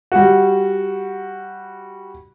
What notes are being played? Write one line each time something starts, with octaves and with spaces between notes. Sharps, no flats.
G3 F#4